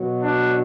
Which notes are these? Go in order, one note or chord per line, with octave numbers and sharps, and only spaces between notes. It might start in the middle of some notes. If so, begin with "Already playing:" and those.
Already playing: B2 F#3
D4